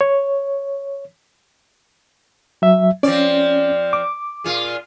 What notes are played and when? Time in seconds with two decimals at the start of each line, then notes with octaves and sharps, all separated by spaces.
0.01 C#5
2.62 F#3 E5
3.03 F3 C4 C#4 D5
3.93 D6
4.44 A#2 F4 G#4